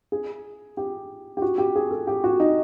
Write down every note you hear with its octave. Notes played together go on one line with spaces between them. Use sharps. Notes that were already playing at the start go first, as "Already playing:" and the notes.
G#4
G4
G4
F#4
G4
G#4
A4
G4
F#4
D#4